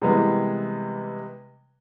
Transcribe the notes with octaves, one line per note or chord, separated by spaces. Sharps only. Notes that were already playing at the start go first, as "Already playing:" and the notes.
C3 E3 G3 G#3 A#3 B3